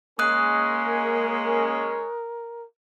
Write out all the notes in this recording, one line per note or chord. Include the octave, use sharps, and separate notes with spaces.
G#3 A#3 C#4 A#4 D#6 F#6